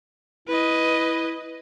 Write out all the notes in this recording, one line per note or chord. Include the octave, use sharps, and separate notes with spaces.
E4 B4 D#5